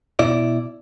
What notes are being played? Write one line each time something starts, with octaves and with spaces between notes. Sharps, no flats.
B2 E4 D5